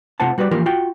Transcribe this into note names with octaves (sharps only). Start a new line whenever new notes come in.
C3 A3 F4 C5 F#5 A5
G3 F#4 B4 C#5 D5
E3 F3 A#3 F4 G4 A#4
F4 F#4 G5